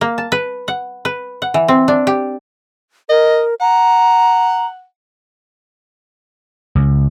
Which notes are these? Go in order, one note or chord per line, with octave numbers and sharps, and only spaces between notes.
A#3
A5
B4
F#5
B4
F#5
E3
C4
D4
G4
A#4 D#5
F#5 A#5
C#2